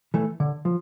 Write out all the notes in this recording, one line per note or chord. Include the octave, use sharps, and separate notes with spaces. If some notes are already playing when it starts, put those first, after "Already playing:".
E3 A3
D3
F3